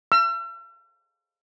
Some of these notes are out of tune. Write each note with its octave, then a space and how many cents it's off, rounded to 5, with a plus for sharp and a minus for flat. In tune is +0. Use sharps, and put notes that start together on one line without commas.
E6 +45